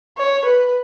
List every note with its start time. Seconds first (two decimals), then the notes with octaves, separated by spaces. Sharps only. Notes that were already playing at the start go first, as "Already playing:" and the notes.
0.18 C#5
0.45 B4